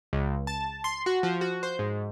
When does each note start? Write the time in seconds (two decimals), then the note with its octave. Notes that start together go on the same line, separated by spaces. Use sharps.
0.13 C#2
0.47 A5
0.84 C6
1.06 F#4
1.23 F3
1.41 F#4
1.63 C5
1.79 G#2